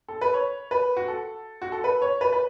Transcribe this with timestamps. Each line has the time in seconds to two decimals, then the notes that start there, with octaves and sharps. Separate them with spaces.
0.08 A4
0.21 B4
0.34 C#5
0.71 B4
0.97 F#4
1.08 A4
1.62 F#4
1.72 A4
1.84 B4
2.02 C#5
2.21 B4
2.33 B4